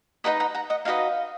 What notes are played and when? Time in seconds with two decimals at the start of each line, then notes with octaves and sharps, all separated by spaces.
0.24 D#4 F#4 B4 D#5 F#5 A#5
0.40 F#5 A#5
0.55 F#5 A#5
0.70 D#5 F#5
0.85 D#4 F#4 B4 D#5 F5